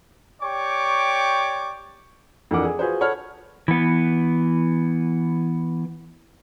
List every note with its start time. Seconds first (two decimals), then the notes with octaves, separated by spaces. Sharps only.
0.42 G4 C#5 D5 G5 C#6 D6
2.51 F2 E3 D4 A#4 F#5 D6
2.63 G#4
2.79 F4 F#4 G#4 B4 C5
3.01 A4 C#5 F#5 B5 F6
3.68 E3 B3